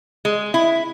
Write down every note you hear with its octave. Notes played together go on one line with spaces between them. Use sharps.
G#3
E4